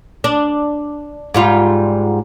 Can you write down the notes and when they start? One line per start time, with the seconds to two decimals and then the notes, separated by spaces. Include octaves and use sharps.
0.24 D4
1.34 G#2 G3 F4